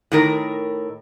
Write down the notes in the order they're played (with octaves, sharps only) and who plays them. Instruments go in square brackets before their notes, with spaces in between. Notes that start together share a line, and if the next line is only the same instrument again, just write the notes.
[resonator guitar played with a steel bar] A2 D#3 A#4